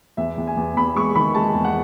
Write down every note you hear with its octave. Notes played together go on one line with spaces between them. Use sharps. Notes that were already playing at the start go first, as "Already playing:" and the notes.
E2 E5
E2
G#5
E2
E2 B5
G#3 C#6
D#3 B5
G#3 A5
E2
F#5